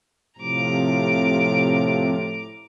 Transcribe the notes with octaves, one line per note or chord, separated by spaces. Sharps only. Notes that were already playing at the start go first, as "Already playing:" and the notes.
A2 C3 F3 A#5 D6